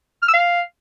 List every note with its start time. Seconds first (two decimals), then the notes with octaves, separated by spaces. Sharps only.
0.22 F6
0.28 E6
0.34 F5